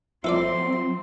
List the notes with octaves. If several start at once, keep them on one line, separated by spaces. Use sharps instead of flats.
F3 F#3 C4 E4 A4 D5 C6